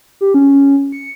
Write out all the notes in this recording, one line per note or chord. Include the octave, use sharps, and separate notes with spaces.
G4
C#4
C#7